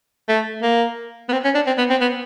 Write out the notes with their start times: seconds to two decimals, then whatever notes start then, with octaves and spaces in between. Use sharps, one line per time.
0.29 A3
0.62 A#3
1.29 B3
1.32 C4
1.44 C#4
1.55 D4
1.67 C4
1.78 B3
1.90 C4
2.01 B3